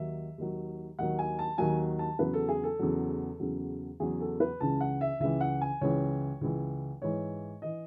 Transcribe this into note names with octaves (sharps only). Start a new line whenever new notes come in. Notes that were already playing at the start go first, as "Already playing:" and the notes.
Already playing: D#2 D#3 F#3 E5
D#2 D#3 F#3
D#2 D#3 F#3 F#5
G#5
A5
D#2 D#3 F#3 G#5
A5
E2 C#3 F#3 B4
A4
G#4
A4
E2 C#3 F#3
E2 C#3 F#3
E2 C#3 F#3 G#4
A4
B4
C#2 C#3 E3 A5
F#5
E5
C#2 C#3 E3 E5
F#5
G#5
C#2 C#3 E3 C#5
C#2 C#3 E3
G#2 E3 C#5
E3 D#5